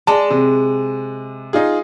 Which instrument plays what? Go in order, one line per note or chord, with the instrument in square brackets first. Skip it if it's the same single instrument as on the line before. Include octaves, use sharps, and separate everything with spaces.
[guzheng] G#3 [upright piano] D5 A5
[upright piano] C3
D#4 F4 G#4